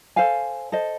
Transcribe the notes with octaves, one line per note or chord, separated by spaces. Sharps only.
A4 C5 F5 G#5
A4 C5 D#5